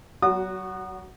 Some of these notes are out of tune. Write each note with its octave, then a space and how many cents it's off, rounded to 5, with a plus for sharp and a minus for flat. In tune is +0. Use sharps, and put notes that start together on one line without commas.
F#3 +35 F#4 +0 D#6 -30